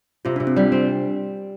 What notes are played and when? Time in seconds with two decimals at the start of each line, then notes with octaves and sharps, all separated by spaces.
0.25 C3 F4
0.36 C3 D4
0.47 C4
0.56 G3 D4
0.72 C4